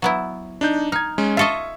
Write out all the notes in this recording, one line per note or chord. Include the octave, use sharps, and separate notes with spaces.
F#3 B3 E4
D4 D#4 G6
D#4 F6 G#6
G#3 C#4
F4 A4 D#5 E5 C#6